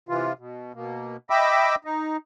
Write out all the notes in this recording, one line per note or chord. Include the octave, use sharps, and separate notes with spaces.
C3 E3 F4
B2
B2 A#3
D#5 E5 G5 B5 D6 E6
D#4